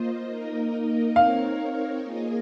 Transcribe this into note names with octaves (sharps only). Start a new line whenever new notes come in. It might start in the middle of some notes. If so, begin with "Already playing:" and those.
Already playing: A#3 F4 C5 D#5
A#3 D#4 A#4 D#5
C4 D#4 A#4 C#5 F5
A#3 F4 G#4 D#5